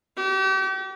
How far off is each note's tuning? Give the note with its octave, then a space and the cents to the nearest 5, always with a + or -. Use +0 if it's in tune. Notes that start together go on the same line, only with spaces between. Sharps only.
G4 -40